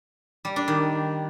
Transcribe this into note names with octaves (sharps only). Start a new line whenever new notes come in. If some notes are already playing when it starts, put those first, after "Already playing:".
G3
D4
D#3